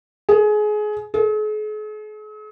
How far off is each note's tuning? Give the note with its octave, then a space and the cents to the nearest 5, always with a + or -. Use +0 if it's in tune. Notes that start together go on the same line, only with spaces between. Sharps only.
G#4 +25
G#4 +45